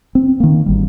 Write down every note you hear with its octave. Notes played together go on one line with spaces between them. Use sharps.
C4
D#3 A#3
G#1 G3